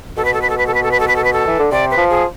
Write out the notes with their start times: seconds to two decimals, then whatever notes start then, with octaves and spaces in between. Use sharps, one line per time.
0.17 B2 A4
0.25 B4
0.34 A4
0.42 B4
0.50 A4
0.58 B4
0.67 A4
0.74 B4
0.83 A4
0.91 B4
1.00 A4
1.08 B4
1.16 A4
1.24 B4
1.33 A4
1.47 E3
1.59 D3
1.72 C3 D5
1.91 B4
1.97 F3
2.10 G#4